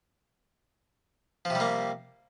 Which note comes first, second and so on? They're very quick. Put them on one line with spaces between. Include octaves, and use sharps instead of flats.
F3 C3 G3 A#3